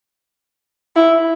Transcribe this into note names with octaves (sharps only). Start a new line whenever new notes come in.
E4